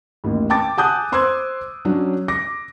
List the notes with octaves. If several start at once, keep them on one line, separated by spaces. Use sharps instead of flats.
A1 D#2
G5 A5 D6 A6
F#5 G#5 A5 D#6 F#6 G6
C5 C6 D6 E6 F#6 G#6
F#3 C#4 D4
D6 A#6